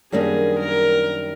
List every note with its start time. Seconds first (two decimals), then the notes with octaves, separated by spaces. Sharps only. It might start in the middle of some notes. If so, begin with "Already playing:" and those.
0.12 F#2 D#3 G3 A#3 D4 G#4
0.59 A#4